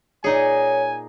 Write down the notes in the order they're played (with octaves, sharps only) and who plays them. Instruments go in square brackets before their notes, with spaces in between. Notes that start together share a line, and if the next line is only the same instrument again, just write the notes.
[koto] A#2 D#4 G#4 [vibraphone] C#5 [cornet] G#5